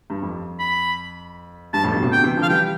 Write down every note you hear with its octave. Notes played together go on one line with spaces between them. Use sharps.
G2
F2
B5
G2 A5
F2 A2
G2 B2
A2 C3
B2 D3 G5
C3 E3
D3 F3
F5
E3 G3 G5